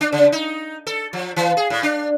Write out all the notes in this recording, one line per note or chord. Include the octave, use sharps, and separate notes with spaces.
D4
C#3
D#4
A4
F3
E3
G#4
A2
D4